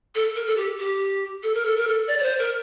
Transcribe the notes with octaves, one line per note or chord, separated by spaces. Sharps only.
A4
A#4
A4
G4
G4
A4
A#4
A4
A#4
A4
D5
D5
C5
A#4